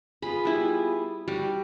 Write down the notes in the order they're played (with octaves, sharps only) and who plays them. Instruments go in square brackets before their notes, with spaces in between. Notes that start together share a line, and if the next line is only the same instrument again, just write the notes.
[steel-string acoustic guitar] B3 F4 G#4 [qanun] B5
[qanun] G3 E4
[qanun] G3 [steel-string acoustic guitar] F#4